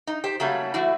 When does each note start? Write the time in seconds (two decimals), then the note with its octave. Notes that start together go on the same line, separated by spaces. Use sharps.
0.07 D#4
0.24 G4 C5
0.40 C#3 F#3 G3 A3 A#3
0.74 E3 A3 E4 F#4